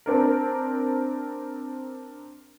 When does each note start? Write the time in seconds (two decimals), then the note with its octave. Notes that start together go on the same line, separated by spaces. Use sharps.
0.06 C4 D4 A#4